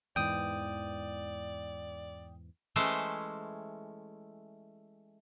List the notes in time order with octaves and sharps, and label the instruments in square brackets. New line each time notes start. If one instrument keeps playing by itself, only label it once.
[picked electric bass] E2 G#2 E3 [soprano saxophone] D5 [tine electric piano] G5 D#6
[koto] E3 G#3 A3 C#4 C5